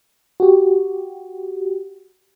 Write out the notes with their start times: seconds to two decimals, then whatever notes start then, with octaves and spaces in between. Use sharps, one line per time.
0.40 F#4 G4